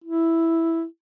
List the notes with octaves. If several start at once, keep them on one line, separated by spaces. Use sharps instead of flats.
E4